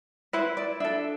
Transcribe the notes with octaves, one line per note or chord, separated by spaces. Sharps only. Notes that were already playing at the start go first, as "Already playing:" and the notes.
E4 B4 C5
D5
D4 A4 E5